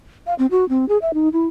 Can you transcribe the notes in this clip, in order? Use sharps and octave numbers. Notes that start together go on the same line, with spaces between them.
F5
C4
F#4
C4
G#4
E5
D#4
E4